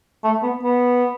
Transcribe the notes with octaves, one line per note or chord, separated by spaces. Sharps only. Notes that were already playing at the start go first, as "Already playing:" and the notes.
A3
B3
B3